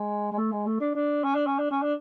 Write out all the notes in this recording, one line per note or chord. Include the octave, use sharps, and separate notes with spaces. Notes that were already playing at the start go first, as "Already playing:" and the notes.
Already playing: G#3
G#3
A3
G#3
A3
D4
D4
C#4
D4
C#4
D4
C#4
D4